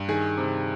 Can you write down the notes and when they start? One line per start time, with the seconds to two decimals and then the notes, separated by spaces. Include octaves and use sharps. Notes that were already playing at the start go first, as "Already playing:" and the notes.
Already playing: G2
0.08 D#3 G#4
0.37 C3